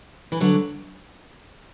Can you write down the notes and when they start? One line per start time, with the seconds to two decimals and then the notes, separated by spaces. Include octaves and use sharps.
0.32 E3
0.40 D3 F#3